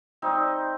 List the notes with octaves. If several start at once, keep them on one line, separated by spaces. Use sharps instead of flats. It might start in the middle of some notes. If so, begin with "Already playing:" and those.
G3 C4 D#4